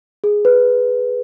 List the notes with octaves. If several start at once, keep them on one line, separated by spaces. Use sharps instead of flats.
G#4
B4